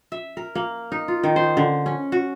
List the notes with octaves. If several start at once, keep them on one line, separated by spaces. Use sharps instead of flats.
E5
A#4
A#3
D#4
F4
D#3
C5
D3
C#4
F#4